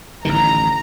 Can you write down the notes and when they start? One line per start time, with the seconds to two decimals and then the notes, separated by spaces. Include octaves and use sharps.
0.25 A1 D3 D#3 A#5